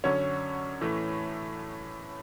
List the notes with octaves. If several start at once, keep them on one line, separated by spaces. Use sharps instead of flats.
F#2 D3 F#3 C#4 C#5
A2 E3 A3